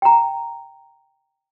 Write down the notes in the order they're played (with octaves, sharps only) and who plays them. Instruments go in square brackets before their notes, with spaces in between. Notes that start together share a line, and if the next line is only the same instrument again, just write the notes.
[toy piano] G5 A#5